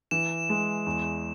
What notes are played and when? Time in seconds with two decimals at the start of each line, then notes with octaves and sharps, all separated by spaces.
0.11 E3 E7
0.50 G#3
0.86 E2